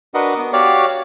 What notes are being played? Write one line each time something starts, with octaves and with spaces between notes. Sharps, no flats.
D4 F#4 A#4 B4 D#5 F#5
B3
F#4 G4 C#5 D5 F5